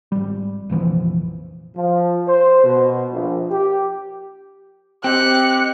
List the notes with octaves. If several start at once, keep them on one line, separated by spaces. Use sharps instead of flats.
G#1 G3
F1 A#1 E3 F3
F3
C5
B2
A#1
G4
C4 G4 D#5 G5 F#6 C#7